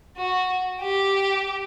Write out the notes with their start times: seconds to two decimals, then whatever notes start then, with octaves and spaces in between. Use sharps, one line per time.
0.17 F#4
0.81 G4